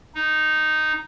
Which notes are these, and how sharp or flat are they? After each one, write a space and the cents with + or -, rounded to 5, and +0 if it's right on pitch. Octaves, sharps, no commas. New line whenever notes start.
D#4 -5